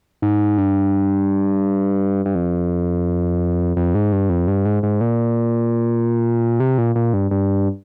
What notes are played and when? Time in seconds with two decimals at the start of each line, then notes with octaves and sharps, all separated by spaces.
0.22 G#2
0.58 G2
2.26 G2
2.35 F2
3.77 F2
3.95 G#2
4.12 G2
4.29 F2
4.48 G2
4.65 G#2
4.83 G#2
5.01 A#2
6.60 C3
6.78 A#2
6.96 A#2
7.13 G2
7.31 G2